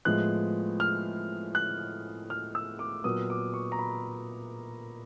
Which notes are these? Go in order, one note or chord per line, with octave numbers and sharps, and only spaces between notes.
A2 F3 G#3 B3 F#6
F6
F#6
F6
E6
D6
A#2 F#3 B3 D#6
D6
C#6
A#5
B5